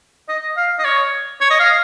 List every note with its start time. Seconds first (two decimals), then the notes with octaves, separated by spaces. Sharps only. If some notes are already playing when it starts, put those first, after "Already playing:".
0.29 D#5
0.57 F5
0.79 D#5
0.85 C#5
1.41 C#5
1.51 D#5
1.60 F5